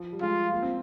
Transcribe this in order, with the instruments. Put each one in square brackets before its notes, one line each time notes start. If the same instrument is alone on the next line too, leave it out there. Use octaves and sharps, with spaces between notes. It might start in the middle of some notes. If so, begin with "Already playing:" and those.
Already playing: [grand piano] F3
G3
[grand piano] G#3 [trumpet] F4
[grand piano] A#3
C4